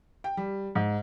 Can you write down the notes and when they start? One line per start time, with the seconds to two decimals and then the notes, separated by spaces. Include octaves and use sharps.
0.24 G5
0.37 G3
0.75 G#2